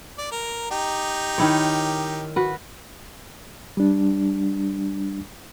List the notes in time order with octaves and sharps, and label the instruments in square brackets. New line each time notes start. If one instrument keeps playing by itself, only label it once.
[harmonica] D5
A#4
D#4 G4
[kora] D#3 E4 C#5
F#4 B4
[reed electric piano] G3 D4